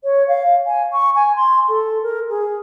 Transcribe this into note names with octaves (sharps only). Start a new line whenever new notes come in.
C#5
F5
G#5
C#6
G#5
C6
A4
A#4
G#4